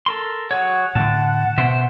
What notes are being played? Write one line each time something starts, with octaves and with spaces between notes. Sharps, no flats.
A4 A#4 C6
F#3 G#4 C#5 F#5
A2 D3 A5
B2 C5 E5